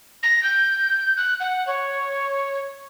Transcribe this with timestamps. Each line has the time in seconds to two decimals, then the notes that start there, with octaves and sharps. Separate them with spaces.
0.23 A#6
0.43 G6
1.17 F#6
1.40 F#5
1.67 C#5